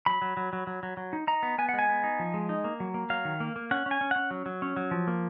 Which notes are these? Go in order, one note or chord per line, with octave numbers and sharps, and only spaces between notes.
F#3 B5
F#3
F#3
F#3
F#3
F#3
F#3
D#4
D#4 A#5
B3
B3 G#5
G#3 F#5
G#5
B3
D#4
F3
G#3
D#4
A#3
F#3
A#3
F#3 F5
D#3
A#3
A#3
C#4 F#5
C#4
G#5
C#4
C#4 F#5
F#3
F#3
C#4
F#3
F3
A#3